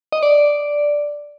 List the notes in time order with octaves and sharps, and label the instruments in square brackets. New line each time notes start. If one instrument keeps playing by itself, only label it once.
[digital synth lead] D#5
D5